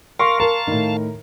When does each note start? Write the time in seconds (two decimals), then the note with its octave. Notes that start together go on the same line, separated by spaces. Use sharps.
0.20 A#4 F5 C6 C#6
0.40 A#4 F5 A5
0.67 A2 D#3